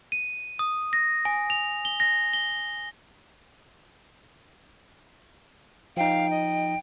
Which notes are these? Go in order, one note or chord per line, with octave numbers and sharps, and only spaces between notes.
D#7
D#6
A#6
G#5
F7
G7
A#6
G7
F3 D#4 F5 G5
D#5